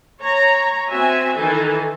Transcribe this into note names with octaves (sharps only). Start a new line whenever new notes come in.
C#5 A#5
C4 F#4 E5 G#5
D#3 E3 A4 G#5